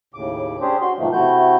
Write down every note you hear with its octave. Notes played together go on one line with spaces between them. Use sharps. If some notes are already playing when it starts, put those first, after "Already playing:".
D#2 A2 C#3 D6
C#4 D4 G4 G#4 C5
F#4 C6
G#2 B2 D#3 F3 A3 A#3
C3 A3 E4 F#4 G6